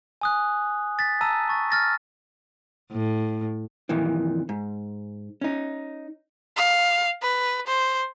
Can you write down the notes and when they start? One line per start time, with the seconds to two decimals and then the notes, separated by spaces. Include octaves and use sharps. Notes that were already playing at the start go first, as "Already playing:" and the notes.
0.21 G#5 D#6 F#6
0.99 A6 B6
1.21 A5 A#5 E6 D#7
1.49 C#6 A6
1.70 F6 A6 A#6
2.92 A2
3.89 F2 A#2 D#3 E3
4.49 G#2
5.41 C#4 D#4
6.57 F5
7.22 B4
7.67 C5